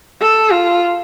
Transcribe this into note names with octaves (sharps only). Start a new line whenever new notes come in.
A4
F4